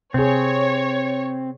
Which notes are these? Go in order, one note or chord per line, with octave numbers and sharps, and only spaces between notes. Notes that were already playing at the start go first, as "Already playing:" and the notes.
C3 C4 G#4 C#5